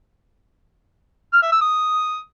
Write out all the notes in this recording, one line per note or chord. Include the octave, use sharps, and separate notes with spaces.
F6
E5
E6
D#6